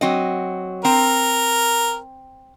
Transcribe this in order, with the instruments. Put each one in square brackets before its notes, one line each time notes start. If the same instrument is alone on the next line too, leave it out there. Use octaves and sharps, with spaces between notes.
[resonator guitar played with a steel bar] F#3 C4 D#5
[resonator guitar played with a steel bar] C4 [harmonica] A#4